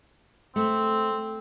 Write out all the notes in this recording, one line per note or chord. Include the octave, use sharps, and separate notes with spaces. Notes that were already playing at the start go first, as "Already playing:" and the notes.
A3 C4